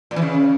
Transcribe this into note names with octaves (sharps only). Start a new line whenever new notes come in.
A#2
E3
C#3